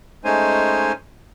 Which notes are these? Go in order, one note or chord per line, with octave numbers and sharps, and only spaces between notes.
G#3 A3 C#4 D#4 C5 G#5